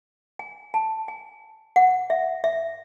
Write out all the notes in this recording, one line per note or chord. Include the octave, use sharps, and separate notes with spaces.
G#5
A5
G#5
F#5
E5
E5